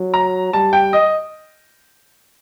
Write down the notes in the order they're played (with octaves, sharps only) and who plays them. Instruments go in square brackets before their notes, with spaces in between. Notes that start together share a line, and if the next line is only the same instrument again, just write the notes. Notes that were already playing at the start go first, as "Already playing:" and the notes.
Already playing: [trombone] F#3
[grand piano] A#5
[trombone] G3 [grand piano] A5
[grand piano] G5
D#5